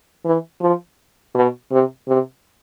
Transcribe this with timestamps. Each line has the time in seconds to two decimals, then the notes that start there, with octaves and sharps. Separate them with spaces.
0.25 E3
0.61 F3
1.35 B2
1.71 C3
2.08 C3